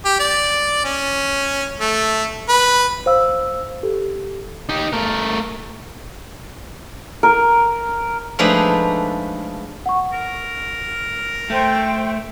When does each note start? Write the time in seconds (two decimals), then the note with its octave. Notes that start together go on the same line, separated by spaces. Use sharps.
0.05 G4
0.20 D5
0.85 C#4
1.80 A3
2.49 B4
3.06 C5 F5 E6
3.83 G4 A4
4.69 D#4 G4
4.93 A3 A#4
7.23 A#4
8.39 F3 G#3 A3 D4 D#4 B4
9.86 F#5 C#6
10.12 A#4
11.50 A3 C5 G5